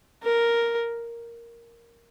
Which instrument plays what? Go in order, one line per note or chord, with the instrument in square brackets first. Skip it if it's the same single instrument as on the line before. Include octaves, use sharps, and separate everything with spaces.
[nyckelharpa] A#4